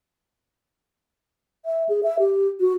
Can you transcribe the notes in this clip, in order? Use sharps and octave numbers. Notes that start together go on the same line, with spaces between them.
E5
G#4
E5
G4
F#4